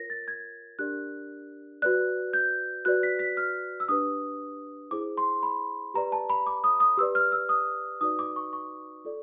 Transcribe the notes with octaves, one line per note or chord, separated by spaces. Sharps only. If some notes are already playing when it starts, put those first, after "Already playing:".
Already playing: F4 A#4 C#5 A#6
A6
G#6
D4 G4 A#4 D5 F#6
F#4 B4 D5 F#6
G6
F#4 B4 D5 F#6
B6
B6
F6
E6
D4 G4 B4 D#6
E4 G#4 C5 D6
C6
B5
G4 B4 D5 A#5
A5
B5
D6
D#6
D#6
G4 B4 D5 E6
F6
E6
D#6
D#4 F#4 B4 D5 D#6
D6
C#6
C#6
F4 A4 D5